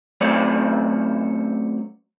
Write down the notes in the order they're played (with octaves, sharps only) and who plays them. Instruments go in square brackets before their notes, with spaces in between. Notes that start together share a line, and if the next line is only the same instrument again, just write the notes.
[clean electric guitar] F#2 F#3 A3 C4 C#5 D5